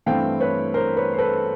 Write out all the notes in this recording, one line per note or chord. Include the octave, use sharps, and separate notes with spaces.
G2 E3 A3 C4 F5 G5
B4 C#5
A#4 C5
B4 C#5
C5
A4 B4